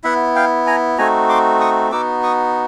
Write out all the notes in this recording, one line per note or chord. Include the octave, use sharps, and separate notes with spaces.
B3 E4 E5 F#5
F5 G5
G#5 A#5
A3 C4 D#4 F#4 G#5 A#5
C6 D6
C#6 D#6
B3 D#4 F#4 D6 E6
C#6 D#6